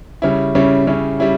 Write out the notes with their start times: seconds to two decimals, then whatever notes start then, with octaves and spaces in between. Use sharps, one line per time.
0.22 C#3 G3 C#4 E4
0.55 C#3 G3 C#4 E4
0.87 C#3 G3 C#4 E4
1.20 G3 C#4 E4